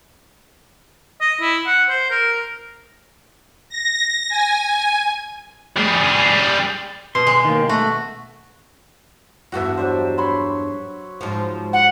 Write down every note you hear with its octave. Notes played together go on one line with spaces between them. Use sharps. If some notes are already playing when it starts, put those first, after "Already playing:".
D#5
E4
F#5
C5
A#4
A#6
G#5
G3 G#4
B2 C6
G#3
D#3 A#3
A3 F#4
E2 G2 B3 F#4 E5
F#3 D4 C5
C#5 B5 C6
G#2 F3
F#5